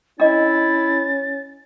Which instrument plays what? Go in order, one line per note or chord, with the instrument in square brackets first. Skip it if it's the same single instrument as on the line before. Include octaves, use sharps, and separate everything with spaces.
[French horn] C#4 [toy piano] D4 D#5 [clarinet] E4 [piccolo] A6